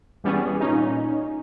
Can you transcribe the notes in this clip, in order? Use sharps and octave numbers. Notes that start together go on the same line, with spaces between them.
E3 G3 B3 C#4 G#4
A#2 C#4 D#4